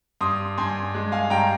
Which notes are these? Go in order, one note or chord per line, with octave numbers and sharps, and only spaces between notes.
G2 C6 D#6
G2 G#5 C6
G#3
F5 G#5
G2 G5 A#5